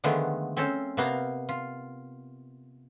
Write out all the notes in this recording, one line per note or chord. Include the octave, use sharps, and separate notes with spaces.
D3 D#3 F3 G#3 A3 B3
C4 C#4 A4 C5
C3 A#3 B3 F5 A#5
F4